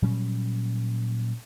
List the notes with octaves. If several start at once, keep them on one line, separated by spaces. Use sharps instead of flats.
A#2 F#3 G3 C#4